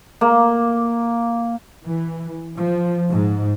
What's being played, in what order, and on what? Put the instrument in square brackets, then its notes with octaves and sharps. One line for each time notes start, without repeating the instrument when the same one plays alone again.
[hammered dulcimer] A#3
[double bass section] E3
F3
G#2